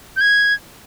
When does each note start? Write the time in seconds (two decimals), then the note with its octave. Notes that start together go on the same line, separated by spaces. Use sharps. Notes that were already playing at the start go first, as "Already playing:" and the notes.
0.16 G6
0.21 G#6